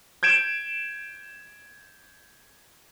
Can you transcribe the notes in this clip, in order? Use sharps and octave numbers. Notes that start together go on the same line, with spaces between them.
G6 G#6 D7 E7